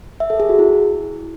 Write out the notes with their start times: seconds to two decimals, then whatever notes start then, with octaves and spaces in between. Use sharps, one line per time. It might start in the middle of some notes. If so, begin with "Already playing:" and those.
0.20 E5
0.30 A4
0.40 G#4
0.49 F#4
0.59 E4